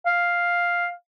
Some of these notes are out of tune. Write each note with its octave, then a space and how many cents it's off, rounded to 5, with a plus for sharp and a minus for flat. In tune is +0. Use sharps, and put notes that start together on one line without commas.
F5 +5